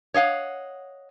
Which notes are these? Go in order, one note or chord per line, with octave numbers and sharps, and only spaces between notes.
C#5 D#5 F5 F#5